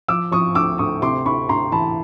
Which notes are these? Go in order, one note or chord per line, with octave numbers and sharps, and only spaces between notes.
F3 D6 E6
F3 C#6 D#6
D2 D6 E6
D2 C#6 D#6
C3 C6 D6
D2 B5 C#6
D2 A#5 C6
E3 A5 B5